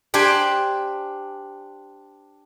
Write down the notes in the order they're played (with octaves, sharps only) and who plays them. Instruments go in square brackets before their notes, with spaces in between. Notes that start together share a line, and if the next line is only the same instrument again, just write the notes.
[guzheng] D4 G4 C5 G5 G#5